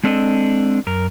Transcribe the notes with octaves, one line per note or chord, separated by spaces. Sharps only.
G#3 C4 D4 A4 D5 D#5
F#2 A#4